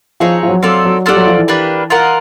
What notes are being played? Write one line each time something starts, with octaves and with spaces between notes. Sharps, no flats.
F3 C4 D#4 G#4 C#5
F3
F#3
F#3 C4 F4 A4 D5
F#3
G3 F4 A4 D5 F#5
F#3
F3
E3
A#3 D4 G4 B4
F4 A#4 D#5 F#5